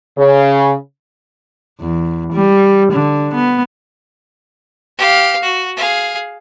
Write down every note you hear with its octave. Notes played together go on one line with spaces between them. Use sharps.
C#3
E2
G3
D3
B3
G4 F5
F#4
G#4 F5